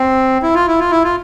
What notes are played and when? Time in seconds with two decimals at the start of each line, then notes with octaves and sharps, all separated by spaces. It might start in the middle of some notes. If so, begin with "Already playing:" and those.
Already playing: C4
0.42 E4
0.54 F4
0.68 E4
0.79 F4
0.91 E4
1.04 F4